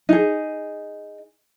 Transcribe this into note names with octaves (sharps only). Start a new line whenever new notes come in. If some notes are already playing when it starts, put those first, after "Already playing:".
D#4 G#4